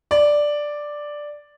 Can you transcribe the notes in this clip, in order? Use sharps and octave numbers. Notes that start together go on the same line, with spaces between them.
D5